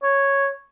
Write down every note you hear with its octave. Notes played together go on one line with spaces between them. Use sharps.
C#5